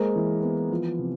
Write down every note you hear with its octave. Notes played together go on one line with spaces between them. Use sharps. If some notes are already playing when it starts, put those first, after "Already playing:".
Already playing: G#3 A#3 A#4 C5
E3
B3
F3
C3